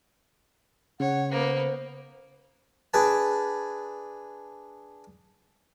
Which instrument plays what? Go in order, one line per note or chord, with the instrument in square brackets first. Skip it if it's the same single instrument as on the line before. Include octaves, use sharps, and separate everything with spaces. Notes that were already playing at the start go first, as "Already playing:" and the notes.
[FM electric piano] C#3 [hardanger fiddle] C#5 [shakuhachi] F#5
[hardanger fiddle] A#3 B3 [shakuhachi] C5
[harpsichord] D4 G#4 B4 A5